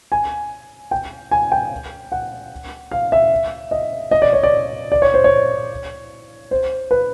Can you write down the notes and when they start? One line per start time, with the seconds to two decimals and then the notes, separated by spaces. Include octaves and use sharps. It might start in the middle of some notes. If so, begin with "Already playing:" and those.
0.12 G#5
0.91 G5
1.31 G#5
1.52 G5
2.12 F#5
2.91 F5
3.12 E5
3.71 D#5
4.11 D#5
4.22 D5
4.33 C#5
4.43 D5
4.92 D5
5.02 C#5
5.14 C5
5.24 C#5
6.51 C5
6.91 B4